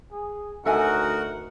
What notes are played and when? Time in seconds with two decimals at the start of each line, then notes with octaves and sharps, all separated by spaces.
0.12 G#4
0.65 D2 D#4 F#4 A4 A#4 E5 F#5 G#5